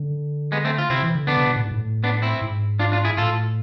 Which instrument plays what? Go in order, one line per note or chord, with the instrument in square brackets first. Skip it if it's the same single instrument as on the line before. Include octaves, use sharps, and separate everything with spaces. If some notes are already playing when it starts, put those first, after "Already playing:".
Already playing: [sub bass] D3
[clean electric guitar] G#3 B3
A3 C4
F4
[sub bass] C3 [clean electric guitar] C4 E4
[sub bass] E3
D3
[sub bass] D3 [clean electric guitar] B3 D4
[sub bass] C3
B2
A2
G#2
A2
[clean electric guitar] B3 D4
C4 E4
[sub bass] G#2
[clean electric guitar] D4 F4
D4 F4
E4 G#4
[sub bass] A2 [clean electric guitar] F4 A4